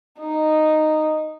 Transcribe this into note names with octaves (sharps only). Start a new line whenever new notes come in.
D#4